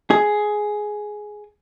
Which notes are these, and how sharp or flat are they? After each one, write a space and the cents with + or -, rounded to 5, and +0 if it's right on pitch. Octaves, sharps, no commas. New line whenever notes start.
G#4 +10